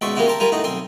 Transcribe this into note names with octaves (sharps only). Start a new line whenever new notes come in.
C#2 B2 D5 E5 C6 C#6
G3 A#3 B3 C#4 E4 F#4
G4 A#4 A5 C6
G3 F4 A#4 B4 G#5
A2 D#4 F#4
B1 C4 G#5 C6